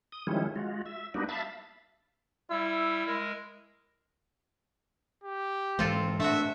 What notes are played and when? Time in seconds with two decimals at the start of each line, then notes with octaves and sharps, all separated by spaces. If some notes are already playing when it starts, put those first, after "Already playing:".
0.12 D#6
0.27 D#3 F3 G3 G#3 C#4 E4
0.56 G#3 F4 F#4
0.86 E5
1.14 G3 A#3 B3 D4 D#4 F#4
1.29 E5 F5 A5 B5
2.50 G3 E4 E6
3.06 G#3 A#4
5.24 G4
5.79 G#2 E3 G#3 C4 F4 A4
6.20 A2 A3 D4 F#4 E5